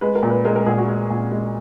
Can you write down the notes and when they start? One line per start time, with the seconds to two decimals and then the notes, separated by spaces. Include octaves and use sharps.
0.01 G#3 B4
0.15 A#4
0.23 A#2
0.30 B4
0.45 G#3 A#4
0.56 A#4
0.66 A#2 G#4
0.78 F#4
0.88 G#3
1.10 A#2
1.32 G#3